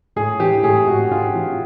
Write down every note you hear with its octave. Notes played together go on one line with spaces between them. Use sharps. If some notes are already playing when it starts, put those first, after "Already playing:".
A2 G#4
E3 G4
A2 G#4
A2 F#4
A2 F4
E3 F4